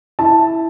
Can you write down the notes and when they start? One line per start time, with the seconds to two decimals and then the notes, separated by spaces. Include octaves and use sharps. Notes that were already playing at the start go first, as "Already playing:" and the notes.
0.19 E4 A5